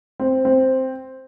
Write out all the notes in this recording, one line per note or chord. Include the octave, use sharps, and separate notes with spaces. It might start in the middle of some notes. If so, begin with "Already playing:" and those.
C4
C4